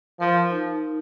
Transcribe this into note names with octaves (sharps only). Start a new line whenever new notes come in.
F3 A#4
D#4